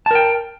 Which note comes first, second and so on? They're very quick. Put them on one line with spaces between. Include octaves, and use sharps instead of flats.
A5 A#4 G5